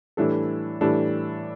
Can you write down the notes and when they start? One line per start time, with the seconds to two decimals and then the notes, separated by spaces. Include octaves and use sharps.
0.17 A2 E3 G3 D4 A4
0.81 A2 E3 G3 D4 A4